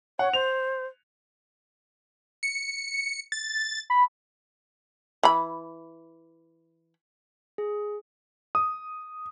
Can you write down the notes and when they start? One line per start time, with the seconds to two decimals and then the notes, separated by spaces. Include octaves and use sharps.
0.19 C#5 F#5
0.33 C5 F7
2.43 C#7
3.32 A6
3.90 B5
5.23 E3 B5
7.58 G#4
8.55 D#6